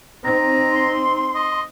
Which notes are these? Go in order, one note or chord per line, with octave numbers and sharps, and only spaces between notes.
C4 D#4 A#5
C6
D#5